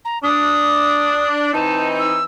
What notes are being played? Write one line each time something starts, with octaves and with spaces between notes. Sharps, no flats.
A#5
D4 D#6
E3 C4 D#4 A5
E6